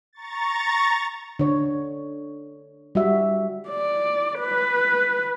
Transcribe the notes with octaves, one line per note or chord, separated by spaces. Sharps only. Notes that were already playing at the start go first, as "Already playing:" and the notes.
A#5 C#6 A6
D3 C#5
G3 F#4 E5
D5
B4